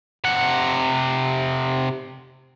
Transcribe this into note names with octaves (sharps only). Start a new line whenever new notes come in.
C3 F#5